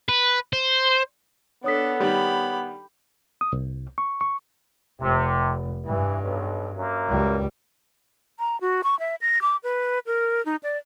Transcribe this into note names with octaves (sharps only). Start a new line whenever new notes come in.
B4
C5
B3 D4 A4 C#5 D#6 B6
D#3 G3 G4 B5
D#6
C2
C#6
C#6
F1 C3
G2 E3
B1
F#2 A#3
C#2 G3
A#5
F#4
C#6
E5
A#6
D6
B4
A#4
D#4
D5